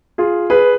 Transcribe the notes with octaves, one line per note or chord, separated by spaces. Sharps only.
F4 G#4
G#4 B4